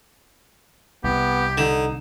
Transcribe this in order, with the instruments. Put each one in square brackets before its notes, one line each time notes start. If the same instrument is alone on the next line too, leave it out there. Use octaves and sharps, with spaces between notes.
[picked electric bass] C2 [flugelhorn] B3 [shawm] G4
[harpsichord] D3 [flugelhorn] D#4